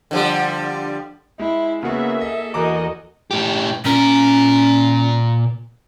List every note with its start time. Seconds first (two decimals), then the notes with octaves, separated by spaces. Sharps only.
0.11 D3 F3 G3
1.39 G#3 E4
1.83 C#3 A#3 B3 F#4 G#4 E5
2.21 A4 D#5
2.54 E2 F#4 A#4 D#5 A#5 D6
3.31 A2 G4
3.85 A#2 C#4 A#4